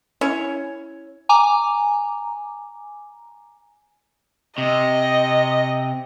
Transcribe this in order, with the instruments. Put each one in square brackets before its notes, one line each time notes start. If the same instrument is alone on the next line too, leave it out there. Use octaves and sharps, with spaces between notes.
[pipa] C#4 E4 C#5
[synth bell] G#5 A#5 D6
[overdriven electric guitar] C3 [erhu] D#5